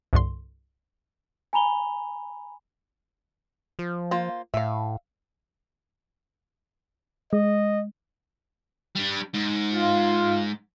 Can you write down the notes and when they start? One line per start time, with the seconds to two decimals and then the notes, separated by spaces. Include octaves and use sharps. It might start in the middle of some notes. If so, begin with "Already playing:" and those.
0.13 C2 G2 D3 C6
1.53 G#5 A#5 B5 F7 G7
3.79 F3
4.11 A#3 F4 C5
4.54 A2 E5 F5
7.33 G#3 D#5
8.96 G3 D4
9.34 G#2
9.73 F4